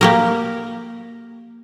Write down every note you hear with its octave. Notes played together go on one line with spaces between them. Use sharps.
A#3 G4 A#4